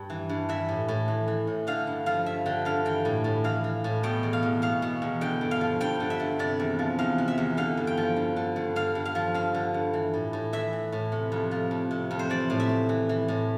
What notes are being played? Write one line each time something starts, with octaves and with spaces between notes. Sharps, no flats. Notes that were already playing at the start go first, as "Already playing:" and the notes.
Already playing: G2 G4
E3
G2
E3 E5
A2
A2
E3
E3
A2
D3 F5
G2
F3 F5
G2 E5
D3 G5
G2 F5
E3 G5
A2
A2
E3 F5
E3
A2
B2 G5
E2
F5
E2
B2 F5
B2
E2
D3 G5
G2
F5
F3
G2 G5
D3
E5
G2
C3 D5
E2
F3
E2 F5
C3
E5
E2
D3 F5
G2
G5
F3
G2
D3
G2
D3 F5
G2
F5
F3
G2 F5
D3
G2
E3
A2
A2
E3 E5
E3
A2
C3
F2
F3
F2
C3
F2
C5
E3 D5
A2
E5
A2
E3
E3
A2